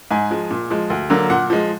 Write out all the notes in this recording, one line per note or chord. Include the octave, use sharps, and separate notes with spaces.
G#2 G#5
F3 G#3
A#2
F3 G#3
D2
D3 F#3 A#3
A#2 F#5
F3 G#3